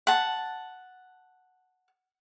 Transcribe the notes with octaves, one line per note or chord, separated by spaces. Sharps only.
F#5 A5